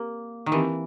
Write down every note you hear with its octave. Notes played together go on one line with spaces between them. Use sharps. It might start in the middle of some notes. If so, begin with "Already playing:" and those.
Already playing: A#3 C4 G4 A#4
D#3
E3 C4 D#4 G4 A#4